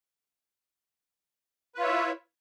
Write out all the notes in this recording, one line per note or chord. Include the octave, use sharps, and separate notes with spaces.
E4 F4 B4 C#5 E5